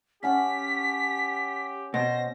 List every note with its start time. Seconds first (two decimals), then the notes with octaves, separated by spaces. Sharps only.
0.23 C#4 G4 F#5 A5 B6
1.94 B2 C5 A#6